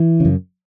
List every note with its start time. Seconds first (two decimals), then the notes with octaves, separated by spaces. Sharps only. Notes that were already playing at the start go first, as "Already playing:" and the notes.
Already playing: E3
0.20 F#2 C#3